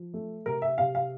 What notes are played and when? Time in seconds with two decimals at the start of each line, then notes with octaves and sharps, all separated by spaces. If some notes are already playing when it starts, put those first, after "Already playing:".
Already playing: F3
0.14 A3
0.46 C3 A#4
0.62 E5
0.78 C3 F5
0.95 F5